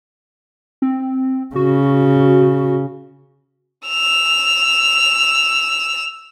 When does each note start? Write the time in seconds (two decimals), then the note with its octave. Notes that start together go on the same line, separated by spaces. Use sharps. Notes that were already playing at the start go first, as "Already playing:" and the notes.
0.82 C4
1.55 C#3 F#4
3.88 E6 F7